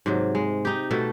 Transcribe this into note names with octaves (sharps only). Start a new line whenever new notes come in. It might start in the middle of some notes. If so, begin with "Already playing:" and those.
G#2 C3 F#3
G#3
D#4 G4
B2 A3 A4